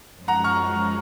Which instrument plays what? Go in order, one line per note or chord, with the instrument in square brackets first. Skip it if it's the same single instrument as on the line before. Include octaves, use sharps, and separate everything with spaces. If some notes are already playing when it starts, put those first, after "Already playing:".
[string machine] F#2 F3 G#3
[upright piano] F#5 A#5
C#6 F6